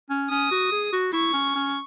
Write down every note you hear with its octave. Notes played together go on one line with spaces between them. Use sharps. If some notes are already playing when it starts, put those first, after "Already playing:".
C#4
C#4 D#6
F#4
G#4
F#4
E4 C#6
C#4
C#4